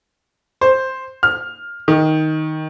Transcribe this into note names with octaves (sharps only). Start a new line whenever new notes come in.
C5
F6
D#3